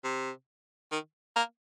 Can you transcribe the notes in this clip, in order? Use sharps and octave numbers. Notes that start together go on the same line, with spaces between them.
C3
D#3
A#3